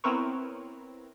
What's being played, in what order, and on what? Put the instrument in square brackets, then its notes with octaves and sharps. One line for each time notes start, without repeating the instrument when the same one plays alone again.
[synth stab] B3 C4 E4 A#4 B4 C#5